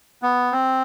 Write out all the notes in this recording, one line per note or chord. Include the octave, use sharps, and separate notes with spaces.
B3
C4